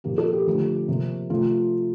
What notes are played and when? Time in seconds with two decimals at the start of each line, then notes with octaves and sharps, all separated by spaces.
0.04 A#2 F3 A#3 G4
0.18 A4
0.33 G4
0.46 D3 F3 A3
0.88 C3 F3 A#3
1.30 C3 F3 A3 F4